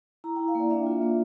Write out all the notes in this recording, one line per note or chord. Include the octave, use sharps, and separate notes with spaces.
E4 A#5
E4 G5
F5
A#3 D5
D4 E5
F4
A#3